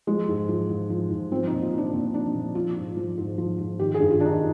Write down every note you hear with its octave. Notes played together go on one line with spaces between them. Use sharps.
F3 G#3
G#2
F3
G#2
F3
G#2
F3 C4
D#4
A#2
F4
F3
D4
A#2 C4
F3 D4
A#2
F3 F4
G#2
F3
G#2
F3
G#2
D#3 G4
G#4
G2
F4
D#3 D4 D#4